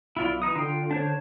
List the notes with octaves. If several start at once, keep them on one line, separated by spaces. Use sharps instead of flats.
B1 E4 F4 D5
E3 D#4 D#6
D3 F4 G5
D4 C5 C#5